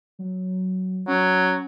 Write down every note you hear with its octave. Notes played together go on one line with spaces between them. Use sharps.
F#3
F#3 C#4